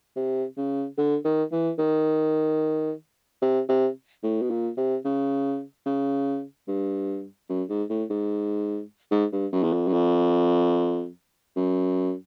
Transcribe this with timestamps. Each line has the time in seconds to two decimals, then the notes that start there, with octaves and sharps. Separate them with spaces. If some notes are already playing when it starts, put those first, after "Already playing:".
0.16 C3
0.57 C#3
0.98 D3
1.25 D#3
1.52 E3
1.78 D#3
3.41 C3
3.68 C3
4.23 A2
4.42 B2
4.50 A#2
4.77 C3
5.05 C#3
5.86 C#3
6.68 G2
7.49 F#2
7.69 G#2
7.90 A2
8.10 G#2
9.11 G#2
9.32 G2
9.52 F#2
9.63 E2
9.73 F2
9.87 F#2
9.93 F2
11.56 F#2